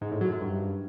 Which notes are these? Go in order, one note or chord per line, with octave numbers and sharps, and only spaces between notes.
G#2
A2
F#3
F#2
G2